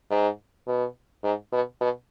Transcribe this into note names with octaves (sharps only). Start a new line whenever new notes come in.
G#2
B2
G#2
B2
B2